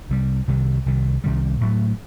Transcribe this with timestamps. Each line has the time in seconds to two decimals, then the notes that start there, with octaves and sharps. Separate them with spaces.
0.09 C2 C3 D#3 G3
0.48 C2 C3 D#3 G3
0.86 C2 C3 D#3 G3
1.24 C2 C3 D#3 G3
1.61 A2 F#3 A3